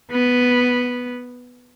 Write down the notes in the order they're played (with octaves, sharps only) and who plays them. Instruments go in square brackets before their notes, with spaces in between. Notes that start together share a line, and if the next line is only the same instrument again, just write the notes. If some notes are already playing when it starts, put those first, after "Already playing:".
[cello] B3